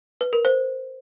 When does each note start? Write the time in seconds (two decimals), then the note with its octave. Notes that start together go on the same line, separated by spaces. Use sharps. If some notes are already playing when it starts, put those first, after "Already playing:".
0.21 B4
0.33 A#4
0.45 C5